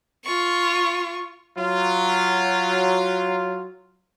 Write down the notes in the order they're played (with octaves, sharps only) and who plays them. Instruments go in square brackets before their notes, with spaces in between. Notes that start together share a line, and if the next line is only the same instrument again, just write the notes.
[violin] F4 C#6
[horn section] F#3 F4